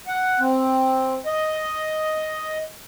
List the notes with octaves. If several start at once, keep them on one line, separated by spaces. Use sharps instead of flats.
F#5
C4
D#5